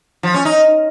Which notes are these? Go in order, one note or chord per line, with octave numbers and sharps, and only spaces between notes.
F3
C#4
D#4